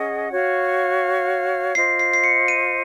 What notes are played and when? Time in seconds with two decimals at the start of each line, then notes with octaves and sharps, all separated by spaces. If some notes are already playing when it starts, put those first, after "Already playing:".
Already playing: C#4 G#4 D#5 F#5
0.31 F#4 C#5 F5
1.75 F4 C5 D#5 C7
1.99 C7
2.13 C7
2.24 C#7
2.48 D#7